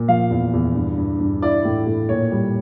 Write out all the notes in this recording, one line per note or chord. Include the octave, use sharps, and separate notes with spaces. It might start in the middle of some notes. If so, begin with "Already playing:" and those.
Already playing: A#2
F3 F5
E2
E2
G2
G2
G2
E4 D5
A2
A2
A#2 C#5
G3